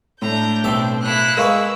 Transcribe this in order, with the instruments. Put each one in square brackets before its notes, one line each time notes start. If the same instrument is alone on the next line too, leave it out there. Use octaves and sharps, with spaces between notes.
[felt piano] A2 [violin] D4 G6 [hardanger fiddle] A#5
[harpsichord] B1 G4 E5 [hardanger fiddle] C4
[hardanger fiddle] A#3 E4 [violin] F#6
[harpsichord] G#3 B4 [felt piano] A#4 F5 C#6 [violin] E6